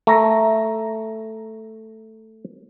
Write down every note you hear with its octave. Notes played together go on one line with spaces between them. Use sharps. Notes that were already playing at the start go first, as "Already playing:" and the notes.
A3 A#5